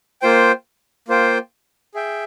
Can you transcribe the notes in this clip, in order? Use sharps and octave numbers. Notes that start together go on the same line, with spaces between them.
A#3 F4 C5 G5
A#3 F4 C5 G5
G#4 E5 G5